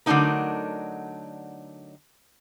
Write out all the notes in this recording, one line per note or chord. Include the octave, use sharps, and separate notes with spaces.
D3 F#3 A3 D4 D#4 A#4